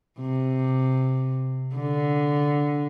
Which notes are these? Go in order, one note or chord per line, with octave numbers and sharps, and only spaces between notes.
C3
D3